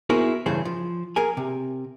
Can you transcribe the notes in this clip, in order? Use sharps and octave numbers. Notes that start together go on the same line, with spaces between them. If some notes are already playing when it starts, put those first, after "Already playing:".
B3 E4 F#4 G#4 A#4 C5
G2 C#3 E3 G#4 C5
F3
G#4 A#4 G#5
C3